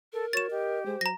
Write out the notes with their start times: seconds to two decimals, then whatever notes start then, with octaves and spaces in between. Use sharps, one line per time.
0.13 A4 A#4
0.33 F#4 C#5 A6 E7
0.51 G4 D#5
0.86 G#3 C5
1.01 F#3 A#5 A#6